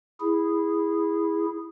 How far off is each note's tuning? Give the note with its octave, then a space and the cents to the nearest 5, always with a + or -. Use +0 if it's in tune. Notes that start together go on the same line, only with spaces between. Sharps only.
E4 +0 G#4 -10